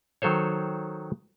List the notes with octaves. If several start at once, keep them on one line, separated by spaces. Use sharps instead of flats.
D#3 F#3 A4 C5 C#5